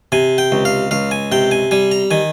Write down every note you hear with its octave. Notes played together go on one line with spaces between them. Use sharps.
C3 G#5
G5
C#2
F5
C#2 F5
G#5
C3 G5
G#5
G3 G#5
A#5
D#3 G#5